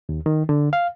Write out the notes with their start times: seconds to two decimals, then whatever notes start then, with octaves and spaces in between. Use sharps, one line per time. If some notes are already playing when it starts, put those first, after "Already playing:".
0.09 D#2
0.26 D#3
0.49 D3
0.73 F5